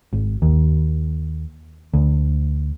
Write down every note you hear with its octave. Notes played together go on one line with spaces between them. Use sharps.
G#1
D#2
D2